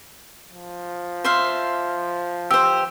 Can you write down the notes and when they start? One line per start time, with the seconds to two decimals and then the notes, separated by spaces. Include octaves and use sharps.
0.53 F3
1.24 C5 E5 F5
2.51 G4 C5 E6